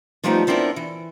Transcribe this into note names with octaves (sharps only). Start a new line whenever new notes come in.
D3 F3 G3 A3 B3 D#4
B3 C4 D4 E4 A#4
E3